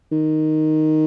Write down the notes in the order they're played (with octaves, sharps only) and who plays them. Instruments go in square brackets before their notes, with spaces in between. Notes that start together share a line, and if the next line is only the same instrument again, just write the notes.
[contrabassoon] D#3